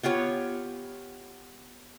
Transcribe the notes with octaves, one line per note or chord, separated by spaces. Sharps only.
B3 F4 G4 C#5